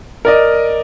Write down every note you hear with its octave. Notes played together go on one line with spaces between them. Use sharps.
A#4 D5 D#5